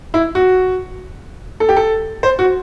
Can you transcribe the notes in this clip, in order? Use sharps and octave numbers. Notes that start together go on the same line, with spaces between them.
E4
F#4
A4
G4
A4
C5
F#4